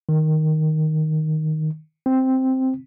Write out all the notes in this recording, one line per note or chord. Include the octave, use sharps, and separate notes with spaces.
D#3
C4